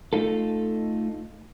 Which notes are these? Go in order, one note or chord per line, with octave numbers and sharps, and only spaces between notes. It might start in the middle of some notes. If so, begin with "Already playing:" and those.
A3 D#4 F4 A4